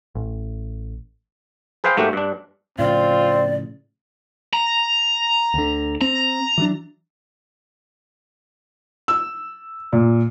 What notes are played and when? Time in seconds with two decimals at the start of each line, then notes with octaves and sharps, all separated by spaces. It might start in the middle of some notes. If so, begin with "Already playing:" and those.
0.15 A1
1.84 G#4 B4 C5 F5 G5
1.97 G#2 A3 A#3 F#4 G4
2.13 G2 D4
2.79 A2 C#3 F3 C4 F4 D5
4.53 A#5
5.54 D2 D3
6.01 C4 A#5
6.58 E3 F#3 D4
9.08 E6
9.92 A#2